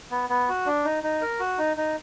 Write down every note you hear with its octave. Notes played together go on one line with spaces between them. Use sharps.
B3
B3
F#4
D4
D#4
D#4
A#4
F#4
D#4
D#4